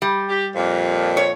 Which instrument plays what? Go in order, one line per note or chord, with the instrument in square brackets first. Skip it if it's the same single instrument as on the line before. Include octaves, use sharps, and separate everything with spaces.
[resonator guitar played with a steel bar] G3
[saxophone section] G4
F2 A#2
[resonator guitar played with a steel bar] C#5